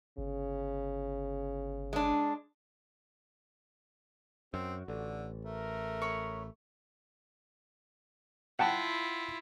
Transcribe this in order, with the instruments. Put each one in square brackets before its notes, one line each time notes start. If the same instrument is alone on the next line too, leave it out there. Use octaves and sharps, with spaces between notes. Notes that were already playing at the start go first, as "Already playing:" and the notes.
[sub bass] G1 [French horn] C#3
[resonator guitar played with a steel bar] G#3 D4
[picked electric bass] F#2 [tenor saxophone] C4 [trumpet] F#4
[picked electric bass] A1 [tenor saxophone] D3
[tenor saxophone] A3 [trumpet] A#4
[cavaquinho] C#5 B5
[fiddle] E4 F4 [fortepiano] F#5 G5 A5